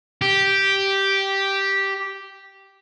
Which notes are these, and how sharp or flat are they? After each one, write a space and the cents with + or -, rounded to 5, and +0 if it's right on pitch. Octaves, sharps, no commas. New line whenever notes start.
G4 -5